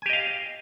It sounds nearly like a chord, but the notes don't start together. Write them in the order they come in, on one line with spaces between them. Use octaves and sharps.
G#5 G4 D#5 F5